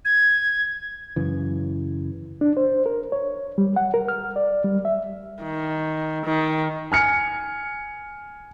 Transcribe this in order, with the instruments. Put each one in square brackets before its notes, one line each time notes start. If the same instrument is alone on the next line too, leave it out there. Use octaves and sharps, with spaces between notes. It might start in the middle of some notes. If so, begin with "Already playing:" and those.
[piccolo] G#6
[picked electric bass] F#2 C#3 E3
[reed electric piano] D4
C5
A#4
C#5
G3
F#5
A#4
F6
D5
G3
E5
[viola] D#3
D#3
[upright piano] G#5 F6 C#7